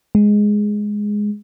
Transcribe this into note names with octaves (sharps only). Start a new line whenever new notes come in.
G#3